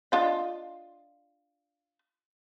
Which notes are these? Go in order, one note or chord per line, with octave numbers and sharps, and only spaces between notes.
D4 F4 D#5